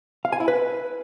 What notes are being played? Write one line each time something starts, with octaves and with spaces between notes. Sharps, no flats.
F5
G#5
E4
B4